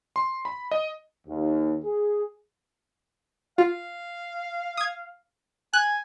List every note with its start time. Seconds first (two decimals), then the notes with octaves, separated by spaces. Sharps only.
0.16 C6
0.45 B5
0.71 D#5
1.27 D#2
1.84 G#4
3.58 F4 F5
4.77 D#6 G#6
5.73 G#5 F#6